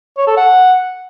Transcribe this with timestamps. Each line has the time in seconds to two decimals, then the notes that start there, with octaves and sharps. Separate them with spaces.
0.17 C#5
0.27 A4
0.37 F#5